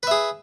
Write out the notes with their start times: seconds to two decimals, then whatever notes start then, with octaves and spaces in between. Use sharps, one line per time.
0.03 B4
0.07 E5
0.11 G#4